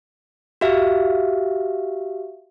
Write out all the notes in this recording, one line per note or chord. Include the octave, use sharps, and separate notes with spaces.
F#4 G4 E5 F5